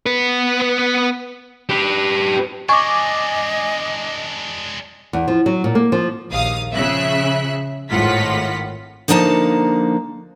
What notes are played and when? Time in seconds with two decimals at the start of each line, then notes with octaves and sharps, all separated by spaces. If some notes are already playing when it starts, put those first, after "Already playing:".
0.06 B3 B4
1.69 G4 B4
2.69 G#3 D4 D#5 G#5 C#6 D6
5.13 E2
5.28 F3
5.46 F#3
5.64 A#2
5.75 A#3
5.92 F3
6.30 A#1 D#2 F5 D#6
6.73 C#3 F3 E5 F#6
7.90 G#1 A2 D#3 F4 F#5 B6
9.08 D3 F3 A#3 D#4 G5 A5